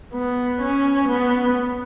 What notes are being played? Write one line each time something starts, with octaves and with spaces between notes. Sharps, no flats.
B3
C#4
B3